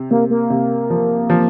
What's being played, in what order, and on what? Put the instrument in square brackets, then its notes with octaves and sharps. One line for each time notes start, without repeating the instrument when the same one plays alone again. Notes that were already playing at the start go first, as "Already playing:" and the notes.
Already playing: [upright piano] C3
[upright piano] C3 [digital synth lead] A#3
[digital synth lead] A#3
[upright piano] C3
F3
F3